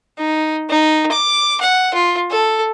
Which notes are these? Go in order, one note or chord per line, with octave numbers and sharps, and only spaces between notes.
D#4
D#4
D6
F#5
F4
A4